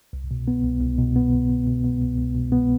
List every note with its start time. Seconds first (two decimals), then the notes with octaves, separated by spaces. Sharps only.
0.13 C2
0.31 B2
0.48 B3
0.64 C2
0.81 C2
0.98 B2
1.16 B3
1.32 C2
1.50 C2
1.67 B2
1.84 B3
2.01 C2
2.18 C2
2.35 B2
2.52 B3